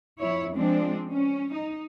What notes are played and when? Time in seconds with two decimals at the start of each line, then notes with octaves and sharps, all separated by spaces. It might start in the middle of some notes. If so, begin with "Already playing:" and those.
0.19 F2 E4 C#5
0.54 F3 G#3 C4 D4
1.10 C#4
1.52 D#4